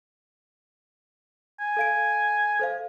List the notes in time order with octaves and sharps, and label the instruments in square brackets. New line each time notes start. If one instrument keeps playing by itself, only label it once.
[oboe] G#5
[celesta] A4 F5 D7
A4 C5 F5